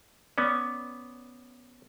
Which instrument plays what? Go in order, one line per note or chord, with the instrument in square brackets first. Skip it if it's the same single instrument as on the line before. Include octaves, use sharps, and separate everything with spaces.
[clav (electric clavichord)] B3 C#4 [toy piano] D5 D6